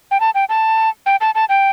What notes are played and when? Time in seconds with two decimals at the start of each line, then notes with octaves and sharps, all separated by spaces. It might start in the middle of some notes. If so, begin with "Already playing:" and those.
0.11 G5
0.20 A5
0.35 G5
0.49 A5
1.06 G5
1.21 A5
1.35 A5
1.49 G5